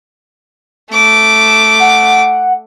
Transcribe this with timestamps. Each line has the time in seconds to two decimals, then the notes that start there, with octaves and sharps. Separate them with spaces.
0.91 A3 D6
1.80 F#5